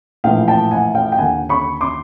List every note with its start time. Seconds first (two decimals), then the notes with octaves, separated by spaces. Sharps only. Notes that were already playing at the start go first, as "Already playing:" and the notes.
0.24 A#1 A2 E3 F5 G5
0.48 G5 A5
0.71 F#5 G#5
0.95 F5 G5
1.12 G5
1.18 D#2 D3 F#5 G#5
1.49 B5 C#6
1.81 C6 D6